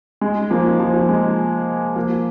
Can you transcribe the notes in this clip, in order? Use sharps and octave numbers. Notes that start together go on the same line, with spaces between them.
G#3
F3 A#3
F3
G#3
F3 A#3